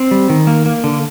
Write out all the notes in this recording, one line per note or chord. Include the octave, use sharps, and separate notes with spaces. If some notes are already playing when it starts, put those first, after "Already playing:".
Already playing: C4
G3
D#3
A#3
A#3
D3